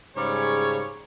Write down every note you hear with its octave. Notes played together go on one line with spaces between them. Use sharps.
G#2 C#3 G3 C#5